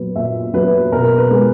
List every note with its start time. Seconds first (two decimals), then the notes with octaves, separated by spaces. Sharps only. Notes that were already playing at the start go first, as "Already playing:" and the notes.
Already playing: A#2 F#3 B3
0.15 A#2 E5
0.54 F#3 B3 B4
0.92 B2 A#4
1.18 B4
1.31 G#3 B3